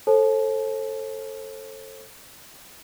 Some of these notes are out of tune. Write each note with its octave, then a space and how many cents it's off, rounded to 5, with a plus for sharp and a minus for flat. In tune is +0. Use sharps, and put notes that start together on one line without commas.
A4 +5 C5 +35 A5 -35